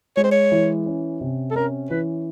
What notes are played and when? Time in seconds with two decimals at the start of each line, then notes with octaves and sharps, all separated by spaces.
0.17 G#3 C#5
0.24 C5
0.32 C#5
0.52 E3
0.86 C#4
1.21 C3
1.51 A4
1.55 C#4 A#4
1.90 E3 B4